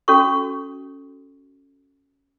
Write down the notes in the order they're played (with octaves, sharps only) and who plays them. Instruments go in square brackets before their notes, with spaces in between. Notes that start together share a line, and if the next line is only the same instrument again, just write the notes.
[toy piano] C#4 F#4 A4 C#6